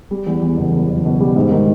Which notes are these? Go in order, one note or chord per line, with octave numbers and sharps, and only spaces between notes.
G3
E2
E2
F#1
E2
F#1
B2
G3
G#2
D#3